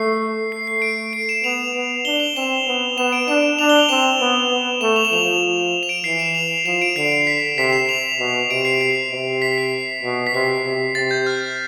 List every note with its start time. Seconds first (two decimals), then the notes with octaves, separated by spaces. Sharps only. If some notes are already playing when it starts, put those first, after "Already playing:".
Already playing: A3 C7
0.52 A3 C7
0.67 C7
0.82 D7
1.13 D7
1.29 E7
1.44 B3 F7
1.75 B3
2.05 D4 G7
2.20 F7
2.36 C4 E7
2.67 B3
2.97 B3 E7
3.12 D7
3.28 D4 E7
3.59 D4 F7
3.69 G7
3.79 F7
3.89 C4 E7
4.20 B3
4.51 B3
4.81 A3 E7
4.96 F7
5.05 E7
5.12 F3 F7
5.83 E7
5.89 D7
6.04 E3 C7
6.19 E7
6.35 F7
6.66 F3 E7
6.81 D7
6.96 D3 C7
7.12 C7
7.27 B6
7.58 C3 B6
7.73 E7
7.89 F7
8.19 B2
8.50 C3 D7
8.65 C7
8.81 C7
9.11 C3
9.42 B6
9.58 C7
10.03 B2
10.27 B6
10.34 C3 C7
10.65 C3
10.95 C3 A6
11.11 G6
11.27 F6